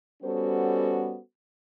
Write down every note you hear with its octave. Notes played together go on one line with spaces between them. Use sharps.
G3 B3 C#4 F#4 A4 C5